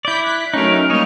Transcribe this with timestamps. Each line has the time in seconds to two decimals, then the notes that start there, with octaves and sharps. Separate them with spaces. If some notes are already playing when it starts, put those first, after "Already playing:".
0.05 E4 D5 G6 B6
0.23 F#6 B6
0.54 F#3 A3 C#4 D#4 A#4
0.90 G3 A#3 D#4 C#5 D#5